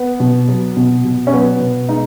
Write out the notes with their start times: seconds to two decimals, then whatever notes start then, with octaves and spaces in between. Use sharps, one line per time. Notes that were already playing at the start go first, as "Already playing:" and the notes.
Already playing: B3
0.20 B2
0.48 F#3
0.77 B2
1.05 B2
1.27 C#4
1.32 F#3 B3
1.61 B2
1.89 G#3 D#4